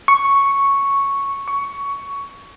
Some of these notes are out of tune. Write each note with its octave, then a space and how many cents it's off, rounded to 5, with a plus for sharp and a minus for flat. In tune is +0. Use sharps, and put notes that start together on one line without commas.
C#6 +0
C#6 +15